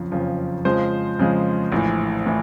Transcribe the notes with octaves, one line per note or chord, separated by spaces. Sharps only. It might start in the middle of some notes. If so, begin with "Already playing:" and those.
Already playing: F#1 F2 C#3 F3
F#1 F2 C#3 F3
F2 C#3 F3 G#3 C5
F2 C#3 F3 G#3
A#1 A2 E3
A2 E3